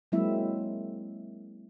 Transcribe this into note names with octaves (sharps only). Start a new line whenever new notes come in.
F#3 G#3 A#3 C4 E4 E5